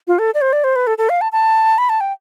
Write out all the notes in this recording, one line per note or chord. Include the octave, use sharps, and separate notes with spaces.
F4
A4
D5
C5
D5
C5
B4
A4
A4
F5
A5
A5
B5
A5
G5